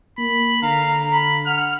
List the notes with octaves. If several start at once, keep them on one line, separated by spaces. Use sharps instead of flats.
A#3 B5
D3 F5 A#5
B5
F#5 F6